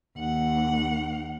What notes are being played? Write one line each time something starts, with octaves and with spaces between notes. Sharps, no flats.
D#2 F#5